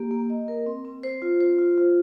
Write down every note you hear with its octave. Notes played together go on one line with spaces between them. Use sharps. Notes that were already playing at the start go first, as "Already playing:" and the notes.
Already playing: A#3 G4
A#3
D#5
A#4
C4
C4
C5
F4
C5
F4
F4